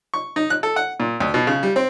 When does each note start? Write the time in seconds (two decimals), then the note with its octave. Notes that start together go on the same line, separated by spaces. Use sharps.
0.14 C#6
0.36 D#4
0.50 F#6
0.63 A4
0.76 F#5
1.00 A#2
1.20 D2
1.34 B2
1.47 C#3
1.63 G3
1.76 C4